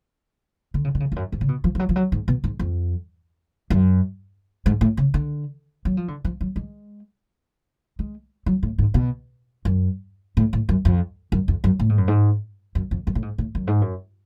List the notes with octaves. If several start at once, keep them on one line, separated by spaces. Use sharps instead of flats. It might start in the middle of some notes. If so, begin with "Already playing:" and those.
D3
C#3
D3
C#3
F2
F#2
G#2
C#3
B2
F3
F3
F#3
F3
F#3
G#2
B2
G#2
F2
F#2
G#2
A2
C#3
D3
F#3
F3
D3
F3
F#3
G#3
G#3
F#3
A2
G#2
B2
F#2
A2
A2
F#2
F2
F#2
F2
F#2
A2
G#2
F#2
G#2
F#2
F2
F#2
A2
G#2
A2
F#2
G#2
F#2